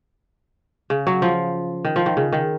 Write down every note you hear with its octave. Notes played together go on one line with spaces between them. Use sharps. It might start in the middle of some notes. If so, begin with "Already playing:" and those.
C#3
F#3
F3
D#3
F3
D#3
C#3
D#3